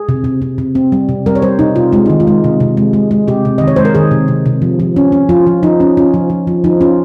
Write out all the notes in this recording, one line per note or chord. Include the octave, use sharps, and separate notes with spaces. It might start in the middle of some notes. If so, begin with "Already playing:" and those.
Already playing: G#4
C3
C3
C3
C3
C4
G3
C3
G3 A#4
C#5
G3 C5
C3 D#4
C3 F4
G#3 F4
D#3 D#4
F4
G#3
C3
C3
G#3
G#3
G#3
C3 G4
C3
D#3 D#5
C#5
G#3 C5
A#4
D#3 G#4
C3
C3
C3
F3
F3
C#4
C#4
F3 F4
F3
F3 D#4
C#4
C#4 F4
F3
F3
F3
F3 D#4
C#4 F4